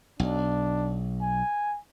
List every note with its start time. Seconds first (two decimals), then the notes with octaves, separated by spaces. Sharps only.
0.20 B1 D4
1.22 G#5